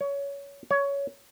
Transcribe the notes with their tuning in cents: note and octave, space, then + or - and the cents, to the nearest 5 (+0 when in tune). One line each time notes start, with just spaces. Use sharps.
C#5 +20
C#5 +15